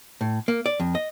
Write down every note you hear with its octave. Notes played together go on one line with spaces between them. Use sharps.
A2
A#3
D5
F2
D#5